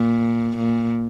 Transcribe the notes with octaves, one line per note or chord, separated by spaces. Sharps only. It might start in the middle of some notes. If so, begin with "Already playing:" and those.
Already playing: A#2
A#2